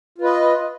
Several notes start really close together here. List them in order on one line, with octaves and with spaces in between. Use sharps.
F4 B4 D#5